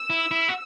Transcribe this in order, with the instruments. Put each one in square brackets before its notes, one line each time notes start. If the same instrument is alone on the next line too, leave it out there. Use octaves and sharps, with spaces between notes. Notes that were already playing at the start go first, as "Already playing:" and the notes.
Already playing: [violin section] E6
[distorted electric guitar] E4
E4
F#4